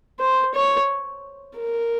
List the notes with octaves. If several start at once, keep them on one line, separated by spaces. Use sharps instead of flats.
C5
C#5
A#4